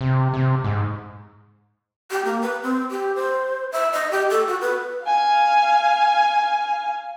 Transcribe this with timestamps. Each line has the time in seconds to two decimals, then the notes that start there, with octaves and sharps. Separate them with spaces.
0.01 C3
0.33 C3
0.64 G#2
2.11 G4
2.25 A#3
2.42 B4
2.63 C4
2.91 G4
3.15 C5
3.72 E5
3.93 D#5
4.12 G4
4.30 A4
4.48 F#4
4.61 B4
5.04 F5 G#5